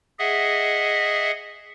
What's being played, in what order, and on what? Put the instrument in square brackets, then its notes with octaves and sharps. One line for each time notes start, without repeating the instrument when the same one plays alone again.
[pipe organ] G#4 D#5 E5 F#5